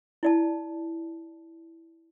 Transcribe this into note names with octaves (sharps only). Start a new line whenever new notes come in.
E4 D5 A5